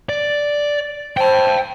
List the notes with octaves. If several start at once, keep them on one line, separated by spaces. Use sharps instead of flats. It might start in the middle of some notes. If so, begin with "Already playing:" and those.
D5
C5 G5 A5